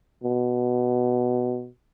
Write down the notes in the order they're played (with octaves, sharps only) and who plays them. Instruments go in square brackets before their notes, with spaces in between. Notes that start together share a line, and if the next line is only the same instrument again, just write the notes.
[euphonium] B2